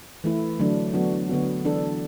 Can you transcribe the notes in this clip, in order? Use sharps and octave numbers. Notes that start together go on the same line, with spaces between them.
E3 A3 E4
D3 F#3 A3 D4
F#3 B3 D4 F#4
D3 B3 F#4
E3 D4 A4